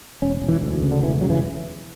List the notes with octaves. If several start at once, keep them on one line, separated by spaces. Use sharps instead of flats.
E1 C#4
E1
E3
D2
C#3
D3
E1 E3
C#3 F#3
E3